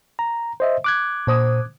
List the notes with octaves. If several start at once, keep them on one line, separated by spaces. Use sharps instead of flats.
A#5
C5 D#5 E5
D6 F#6 G#6
A#2 C5 D#6